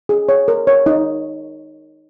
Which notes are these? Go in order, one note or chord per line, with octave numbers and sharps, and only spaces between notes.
G#4
C#5
A#4
C#5
D#4